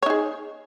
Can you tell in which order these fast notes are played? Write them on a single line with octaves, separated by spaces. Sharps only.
C#5 D#4 G#4